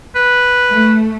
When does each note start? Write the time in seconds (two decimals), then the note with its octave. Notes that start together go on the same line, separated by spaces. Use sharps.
0.16 B4
0.72 A3